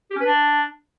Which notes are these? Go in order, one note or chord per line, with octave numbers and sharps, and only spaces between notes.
G4
C#4
B4
D4